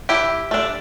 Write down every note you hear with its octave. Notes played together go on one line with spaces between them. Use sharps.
E3 E4 G4
A3 D4